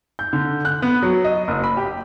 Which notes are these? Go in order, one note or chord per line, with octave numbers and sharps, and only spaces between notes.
G6
D3
F#6
B3
F#3
D#5
F#1
B5
G4